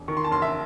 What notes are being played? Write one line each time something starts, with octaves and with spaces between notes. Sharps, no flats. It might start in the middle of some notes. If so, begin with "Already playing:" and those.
Already playing: E1
D#3 C#6
C6
A5
F#1 C6
E5